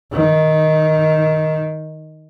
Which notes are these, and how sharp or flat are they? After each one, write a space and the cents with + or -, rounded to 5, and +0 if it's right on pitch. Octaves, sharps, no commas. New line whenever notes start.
D#3 +5